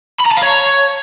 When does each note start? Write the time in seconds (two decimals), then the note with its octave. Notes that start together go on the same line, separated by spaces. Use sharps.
0.20 B5
0.26 A#5
0.32 A5
0.37 F5
0.43 C#5